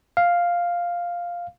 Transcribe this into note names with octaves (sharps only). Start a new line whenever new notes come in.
F5